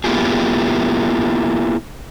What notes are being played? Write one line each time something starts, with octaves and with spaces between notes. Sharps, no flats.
A#3 B3 E4 F4 G4 G#4